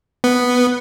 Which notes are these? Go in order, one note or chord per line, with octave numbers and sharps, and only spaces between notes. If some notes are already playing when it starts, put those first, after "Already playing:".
B3